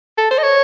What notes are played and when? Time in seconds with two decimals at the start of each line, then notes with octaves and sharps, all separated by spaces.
0.18 A4
0.31 C5
0.38 D#5
0.43 C#5